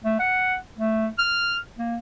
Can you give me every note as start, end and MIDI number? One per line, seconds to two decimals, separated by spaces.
0.04 0.17 57
0.19 0.55 78
0.78 1.08 57
1.19 1.54 89
1.78 1.96 58